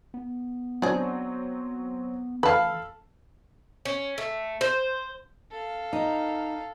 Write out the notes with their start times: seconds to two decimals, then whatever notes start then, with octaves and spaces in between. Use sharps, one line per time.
0.14 B3
0.82 F#3 C4 D4 G#4
2.43 E3 A4 B4 F5 A5 B5
3.85 C#4
4.18 A3
4.61 C5
5.51 A4 F5
5.93 D#4